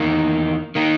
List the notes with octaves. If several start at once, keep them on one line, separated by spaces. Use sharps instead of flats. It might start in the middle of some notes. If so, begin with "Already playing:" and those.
Already playing: E2 D#3 A#3 D#4
D#3 A#3 D#4